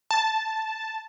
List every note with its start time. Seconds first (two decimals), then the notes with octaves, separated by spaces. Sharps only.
0.11 A5